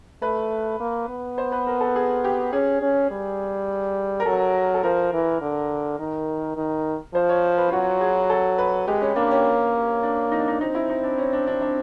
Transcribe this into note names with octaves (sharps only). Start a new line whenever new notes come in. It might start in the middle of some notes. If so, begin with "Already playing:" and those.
A3 B4
A#3
B3
C5
B4
A#4
A4
G#4
G4
C#4 G#4
C#4
G3
A#4
F#3 A4
A4
F3 A#4
E3
D3
D#3
D#3
F3 C5
C#5
B4
F4
F#3 F#4
G#4
A4
B4
G#3 G4
C#4
A#3 D4
C#4
D4
D#4
D4
D#4
C4 D#4
E4
D#4
D4
C#4
D4
D4
D4